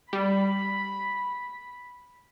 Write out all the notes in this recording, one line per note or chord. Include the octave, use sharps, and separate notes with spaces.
G3 B5